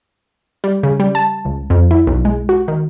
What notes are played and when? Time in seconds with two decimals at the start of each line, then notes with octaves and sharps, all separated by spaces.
0.64 G3
0.83 C#3
1.00 G3
1.15 A5
1.45 C#2
1.70 F2
1.91 E4
2.07 B1
2.25 G#3
2.49 F#4
2.68 D#3